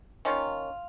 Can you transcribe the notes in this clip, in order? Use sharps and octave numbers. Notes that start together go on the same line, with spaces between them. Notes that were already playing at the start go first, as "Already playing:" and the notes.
D#3 A#3 C#4 F4